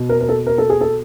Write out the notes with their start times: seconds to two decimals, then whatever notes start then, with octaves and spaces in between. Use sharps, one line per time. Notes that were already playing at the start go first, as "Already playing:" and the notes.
Already playing: B2
0.09 A#4
0.21 A#4
0.29 A4
0.47 A#4
0.58 A4
0.70 G#4
0.81 A4